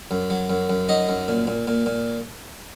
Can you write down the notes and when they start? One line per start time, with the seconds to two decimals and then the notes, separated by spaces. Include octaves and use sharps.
0.11 F#2
0.30 F#3
0.50 F#2
0.70 F#2
0.89 F#3 D#4 D#5
1.09 F#2
1.28 A#2
1.47 A#2
1.67 A#2
1.86 A#2